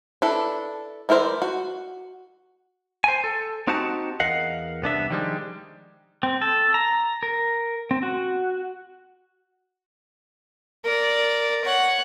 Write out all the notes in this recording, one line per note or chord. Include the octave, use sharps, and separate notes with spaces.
D4 E4 A4 B4
E3 E4 A#4 C5 D5
F#4
C5 G#5
A4
C4 D#4 F#4 G4 F#5 A5
E2 A#4 D#5 F5 F#5
C2 B3 D4 E5
D#3 F3 G3 G#3 D4
C4
A4
A#5
A#4
C4
F#4
A#4 D5
C#5 F#5